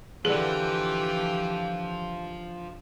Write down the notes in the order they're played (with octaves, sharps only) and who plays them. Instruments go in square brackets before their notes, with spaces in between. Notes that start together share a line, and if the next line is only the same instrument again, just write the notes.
[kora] D3 E4 B4 [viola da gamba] E3 G4 [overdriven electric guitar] F3 [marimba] G#4